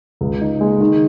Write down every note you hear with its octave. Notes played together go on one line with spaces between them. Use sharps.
C#2
D#4
G#3
D#3